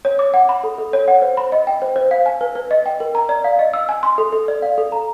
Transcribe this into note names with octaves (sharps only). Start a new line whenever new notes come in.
C#5
D6
F#5
B5
A4
A4
C#5
F#5
C5
B5
D#5
G5
C5
C5
F5
G#5
B4
B4
D#5
G5
A#4
A#5
D5
F5
D#5
E6
G#5
C6
A4
A4
D5
F5
A4
A#5